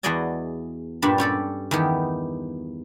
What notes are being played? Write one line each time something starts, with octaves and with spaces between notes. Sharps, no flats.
E2 F#4 G#4 D5 D#5 A5
G2 A#2 G3 D4 A5 B5
C#4 G4 A4 D5
E2 D#3 B3 G4